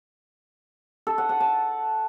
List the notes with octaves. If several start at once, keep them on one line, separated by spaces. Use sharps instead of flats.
A4
F#5
F#5
A5